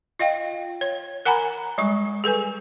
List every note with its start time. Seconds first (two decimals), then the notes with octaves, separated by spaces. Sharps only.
0.19 F4 D#5 F5 G5
0.81 C#5
1.26 A#4 F#5 G#5 A#5 B5
1.78 G3 G#3 C#6
2.24 G#4 A4 B4 G#5